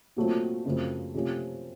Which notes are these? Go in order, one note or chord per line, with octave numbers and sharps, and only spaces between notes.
A#2 F#3 A3 C4
F#2 C#3 F3 A3 C4
C3 F3 A3 C#4